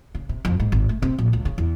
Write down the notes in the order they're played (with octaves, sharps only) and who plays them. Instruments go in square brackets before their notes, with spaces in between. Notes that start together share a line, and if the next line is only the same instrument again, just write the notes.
[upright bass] C#3
C3
F2
G#2
G#1
A3
C3
A#1
C#2
C#3
E2